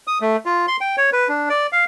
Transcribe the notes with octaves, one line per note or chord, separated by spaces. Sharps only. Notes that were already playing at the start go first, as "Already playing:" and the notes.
D#6
A3
F4
C6
G5
C#5
B4
D4
D5
F5